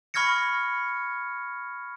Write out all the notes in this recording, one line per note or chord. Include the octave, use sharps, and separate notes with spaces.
B5 C#6 F6 G#6 A#6 C#7